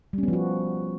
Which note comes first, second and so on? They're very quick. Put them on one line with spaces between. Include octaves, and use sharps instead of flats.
G3 C#4 B3 F3 F#4